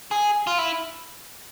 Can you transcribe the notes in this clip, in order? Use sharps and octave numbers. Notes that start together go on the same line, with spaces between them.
G#4
F4
E4